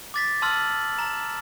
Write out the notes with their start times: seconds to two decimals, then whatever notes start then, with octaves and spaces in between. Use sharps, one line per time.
0.14 D6 A6 B6
0.42 A5 C6 E6 F6 A6 F#7
0.98 A#5 E7